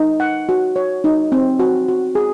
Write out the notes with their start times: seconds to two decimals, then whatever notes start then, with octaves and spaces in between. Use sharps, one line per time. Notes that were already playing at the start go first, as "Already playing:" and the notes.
Already playing: D#4
0.20 F#5
0.49 F#4
0.76 C#5
1.04 D#4
1.32 C4
1.59 F#4
1.88 F#4
2.15 G#4